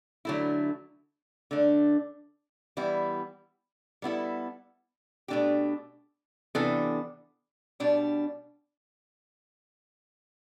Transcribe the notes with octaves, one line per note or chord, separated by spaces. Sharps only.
D3 F#3 A3 E4
D3 A3 D4
E3 G3 B3 E4
G3 B3 E4 A4
B2 A3 D4 G4
C3 E3 B3 D4 A4
B2 G3 D4